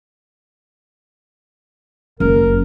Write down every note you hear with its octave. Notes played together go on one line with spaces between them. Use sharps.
F#1 A#4